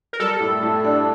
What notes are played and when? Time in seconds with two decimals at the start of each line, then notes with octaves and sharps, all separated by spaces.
0.13 A#4
0.20 G3 A4
0.40 A2
0.63 A2
0.84 D4